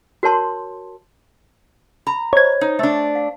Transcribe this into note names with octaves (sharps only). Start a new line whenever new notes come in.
F#4 A#4 C#5 A5 C6
A#5 B5
C5 C#5 D#5 G#6
D#4
A3 D4
F5